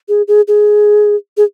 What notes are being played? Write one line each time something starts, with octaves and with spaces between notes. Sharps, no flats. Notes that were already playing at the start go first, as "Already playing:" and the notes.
G#4
G#4
G#4
G#4